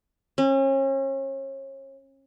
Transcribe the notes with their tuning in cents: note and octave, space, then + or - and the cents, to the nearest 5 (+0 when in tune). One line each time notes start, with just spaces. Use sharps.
C#4 -35